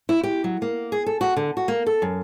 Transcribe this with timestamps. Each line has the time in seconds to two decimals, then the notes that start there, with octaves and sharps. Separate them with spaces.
0.09 E4
0.23 G4
0.44 F#3
0.62 A#3
0.92 G#4
1.06 A4
1.21 F#4
1.37 D3
1.57 F#4
1.68 A#3
1.86 A4
2.02 F#2